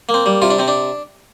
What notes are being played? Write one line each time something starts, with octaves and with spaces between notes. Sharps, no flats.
A#3
C4
G3
C3 F4
D4
C3 C4
D4